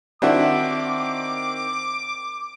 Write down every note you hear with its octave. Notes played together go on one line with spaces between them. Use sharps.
D#3 C4 D4 E4 F#4 D6